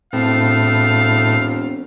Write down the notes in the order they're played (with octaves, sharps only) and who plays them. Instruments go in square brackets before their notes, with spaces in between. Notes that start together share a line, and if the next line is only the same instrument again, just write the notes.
[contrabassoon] E1 [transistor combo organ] A2 [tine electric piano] C4 [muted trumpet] F5